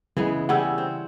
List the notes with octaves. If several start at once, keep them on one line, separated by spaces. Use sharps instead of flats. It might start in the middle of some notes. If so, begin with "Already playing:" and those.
C#3 E3 G#3 B3
C#3 G3 C#4 F#5 E6
C4